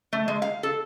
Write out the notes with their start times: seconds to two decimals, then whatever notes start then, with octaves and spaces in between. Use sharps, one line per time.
0.13 A3
0.28 G#3
0.42 F5
0.63 A4